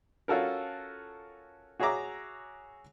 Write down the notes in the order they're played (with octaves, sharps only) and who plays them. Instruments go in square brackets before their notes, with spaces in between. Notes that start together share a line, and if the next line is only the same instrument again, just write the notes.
[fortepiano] C#4 F4 F#4 A4 A#4
F#4 G#4 C#5 E5 A#5 D6